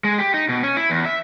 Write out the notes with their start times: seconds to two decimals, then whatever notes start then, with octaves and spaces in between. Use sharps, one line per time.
0.04 G#3
0.18 G4
0.34 D#4
0.49 B2
0.63 C#4
0.77 E4
0.90 E2
1.05 E5